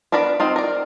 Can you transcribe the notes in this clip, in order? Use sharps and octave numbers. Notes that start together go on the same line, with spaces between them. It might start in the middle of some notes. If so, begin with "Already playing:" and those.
B3 D4 A#4 D5 B5
C4 D#4 F4
A#4 D5